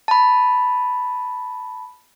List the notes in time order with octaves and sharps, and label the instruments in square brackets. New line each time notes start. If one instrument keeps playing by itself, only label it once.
[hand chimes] A5 B5